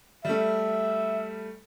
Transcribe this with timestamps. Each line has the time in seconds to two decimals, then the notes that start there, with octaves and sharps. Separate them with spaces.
0.25 G3 A3 E5